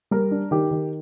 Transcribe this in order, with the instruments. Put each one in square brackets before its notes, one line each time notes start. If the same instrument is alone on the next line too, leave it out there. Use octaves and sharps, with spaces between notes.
[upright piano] G3 A#4
D4
D#3 G4
D#3